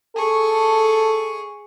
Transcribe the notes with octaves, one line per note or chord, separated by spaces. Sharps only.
G#4 A4 C#6